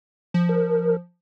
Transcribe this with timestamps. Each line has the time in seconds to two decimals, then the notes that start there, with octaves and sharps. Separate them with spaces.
0.34 F3
0.49 A#4